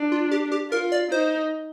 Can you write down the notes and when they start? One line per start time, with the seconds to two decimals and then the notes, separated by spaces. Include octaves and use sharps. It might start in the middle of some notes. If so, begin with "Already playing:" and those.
Already playing: D4
0.12 F4
0.31 G4
0.52 G4
0.72 F4 A#4
0.92 D5
1.11 D#4 C5